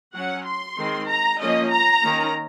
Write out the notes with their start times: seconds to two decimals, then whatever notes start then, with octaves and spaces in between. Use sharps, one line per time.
0.15 F#3 C#4 F#5
0.46 C6
0.78 D#3 G#3 C4
1.09 A#5
1.40 F3 A#3 C#4 D#5
1.71 A#5
2.03 D#3 A#3 C#4